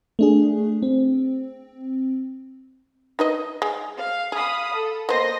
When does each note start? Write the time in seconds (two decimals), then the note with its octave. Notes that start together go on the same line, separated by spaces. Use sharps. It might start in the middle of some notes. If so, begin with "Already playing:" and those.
0.19 A3 D4 G#4
0.82 C4
3.19 D#4 B4 D#5
3.62 G#3
3.97 F5
4.32 G#4 F5 B5 D#6
4.74 A4
5.09 A#3 B3 C5 D#5 C6 A#6